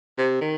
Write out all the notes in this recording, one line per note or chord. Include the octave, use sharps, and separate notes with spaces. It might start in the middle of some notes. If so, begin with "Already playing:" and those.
C3
D#3